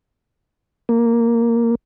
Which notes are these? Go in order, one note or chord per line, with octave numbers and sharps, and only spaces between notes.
A#3